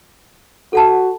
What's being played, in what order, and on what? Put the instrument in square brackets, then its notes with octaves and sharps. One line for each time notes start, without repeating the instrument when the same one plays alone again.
[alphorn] F#4 [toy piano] A4 F#5 A5